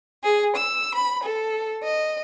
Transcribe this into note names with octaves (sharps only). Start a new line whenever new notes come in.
G#4
E6
B5
A4
D#5